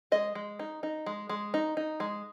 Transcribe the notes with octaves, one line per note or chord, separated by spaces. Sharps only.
G#3 D#5
G#3
D#4
D#4
G#3
G#3
D#4
D#4
G#3